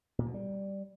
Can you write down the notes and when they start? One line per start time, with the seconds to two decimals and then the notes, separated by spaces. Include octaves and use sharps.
0.19 A#2
0.26 B2
0.34 G3